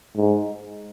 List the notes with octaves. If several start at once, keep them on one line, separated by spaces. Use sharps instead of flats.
G#2